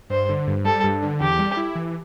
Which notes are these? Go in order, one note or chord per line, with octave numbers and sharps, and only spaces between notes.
G2 C5
D3
G2
G3 A4
G2
D3
E2 G4
G3
E4
E3